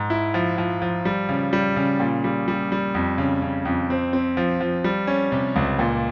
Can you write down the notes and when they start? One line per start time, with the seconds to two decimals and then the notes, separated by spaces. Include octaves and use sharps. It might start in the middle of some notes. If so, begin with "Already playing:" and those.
Already playing: G#2
0.10 E4
0.34 F3
0.58 F3
0.82 F3
1.05 G3
1.29 C#3
1.53 G3
1.76 C#3
2.00 A#2
2.24 G3
2.48 G3
2.72 G3
2.95 F2
3.18 C#3
3.42 C#3
3.65 F2
3.90 C4
4.13 C4
4.37 F3
4.61 F3
4.84 G3
5.07 C#4
5.32 C3
5.56 C#2
5.79 A#2